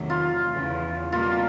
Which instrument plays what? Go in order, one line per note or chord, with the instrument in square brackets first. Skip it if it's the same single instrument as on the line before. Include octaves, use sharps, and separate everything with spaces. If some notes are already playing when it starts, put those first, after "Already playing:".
Already playing: [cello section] E2 C3 D#3 F#3 A3
[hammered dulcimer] F4
[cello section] E2 C#3 E3
[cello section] B2 G3 A#3 [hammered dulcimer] F4